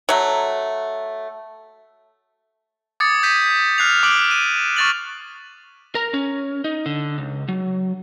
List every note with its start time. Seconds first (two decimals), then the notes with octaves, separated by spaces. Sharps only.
0.09 F#3 A3
3.00 D6 D#6 G#6 A6 C#7
3.23 G6 B6 D#7
3.78 F6 F#6 C7 F7
4.03 D6 D7 F#7
4.31 D#7
4.76 C#6 F6 A6 F7 F#7
5.95 A#4 A#5
6.14 C#4
6.64 D#4
6.86 D3
7.18 C#2
7.48 F#3